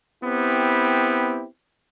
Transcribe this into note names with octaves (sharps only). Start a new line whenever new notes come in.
B3 C4 E4 G4